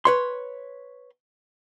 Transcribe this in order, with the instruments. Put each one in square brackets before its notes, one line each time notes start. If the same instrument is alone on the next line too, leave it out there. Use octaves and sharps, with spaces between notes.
[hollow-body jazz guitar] B4 C#5 C6